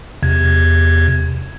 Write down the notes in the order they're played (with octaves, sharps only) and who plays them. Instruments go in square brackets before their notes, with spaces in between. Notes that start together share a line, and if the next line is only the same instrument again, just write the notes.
[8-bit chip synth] E2 C3 G#6